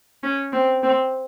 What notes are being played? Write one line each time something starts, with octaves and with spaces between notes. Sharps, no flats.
C#4
C4
C4